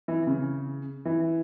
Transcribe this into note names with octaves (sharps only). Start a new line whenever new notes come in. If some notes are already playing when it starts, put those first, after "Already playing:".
E3
C#3
E3